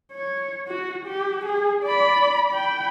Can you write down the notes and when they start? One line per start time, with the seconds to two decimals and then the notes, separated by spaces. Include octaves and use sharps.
0.12 C#5
0.67 F#4
1.06 G4
1.46 G#4
1.84 D5 B5
2.51 G5 B5